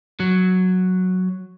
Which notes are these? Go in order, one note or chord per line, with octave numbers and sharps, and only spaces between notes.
F#3